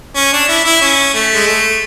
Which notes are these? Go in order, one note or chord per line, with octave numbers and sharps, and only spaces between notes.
C#4
D4
E4
E4
C#4
A3
G#3
A3